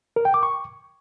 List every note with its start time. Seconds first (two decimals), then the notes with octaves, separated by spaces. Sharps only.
0.16 A#4
0.25 G5
0.34 D6
0.43 C#6